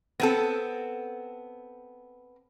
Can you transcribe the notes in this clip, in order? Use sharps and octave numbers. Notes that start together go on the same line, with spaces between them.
B3 C4 A4